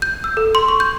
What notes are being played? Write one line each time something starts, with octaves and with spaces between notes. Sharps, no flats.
G6
E6
A4
C6
C#6
G6